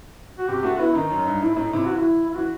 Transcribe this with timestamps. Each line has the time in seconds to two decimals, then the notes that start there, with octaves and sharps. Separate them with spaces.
0.38 F#4
0.48 C3 G4
0.63 A3 F#4
0.79 B3 E4
0.95 D#3 D#4
1.10 F#2
1.26 G2
1.41 A2 E4
1.53 E4
1.57 A2 D#4
1.73 C3 E4
1.86 E3 F#4
1.98 E4
2.27 E4
2.35 E3 F#4